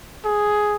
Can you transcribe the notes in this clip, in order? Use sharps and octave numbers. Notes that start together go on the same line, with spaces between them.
G#4